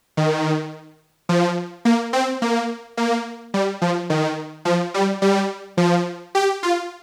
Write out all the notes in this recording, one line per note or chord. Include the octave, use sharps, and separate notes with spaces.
D#3
F3
A#3
C4
A#3
A#3
G3
F3
D#3
F3
G3
G3
F3
G4
F4